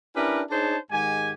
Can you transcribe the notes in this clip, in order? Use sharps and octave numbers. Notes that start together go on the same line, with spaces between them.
C#4 D4 E4 G4 A#4 B4
D4 D#4 G#4 C5 C#5 A5
G#2 D#3 G#3 G4 G#5